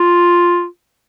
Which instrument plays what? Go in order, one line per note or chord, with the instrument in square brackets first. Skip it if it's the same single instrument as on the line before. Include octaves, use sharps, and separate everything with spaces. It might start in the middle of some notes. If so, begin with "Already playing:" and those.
Already playing: [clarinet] F4